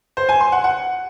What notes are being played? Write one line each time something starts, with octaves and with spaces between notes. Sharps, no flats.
C5
G#5
C6
F#5
F#5